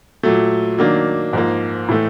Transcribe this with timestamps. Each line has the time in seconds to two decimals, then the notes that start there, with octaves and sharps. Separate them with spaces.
0.23 A#2 F#3 A3
0.78 D#3 F#3 A#3 D4
1.33 G#2 F3 A#3
1.88 A2 E3 A3